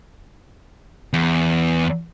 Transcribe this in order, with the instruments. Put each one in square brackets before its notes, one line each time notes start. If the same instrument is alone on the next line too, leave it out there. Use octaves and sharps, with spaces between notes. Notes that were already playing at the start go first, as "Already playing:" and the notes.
[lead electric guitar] E2